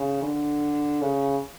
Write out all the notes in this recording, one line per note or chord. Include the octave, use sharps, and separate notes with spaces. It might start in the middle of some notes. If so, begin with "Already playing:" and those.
Already playing: C#3
D3
C#3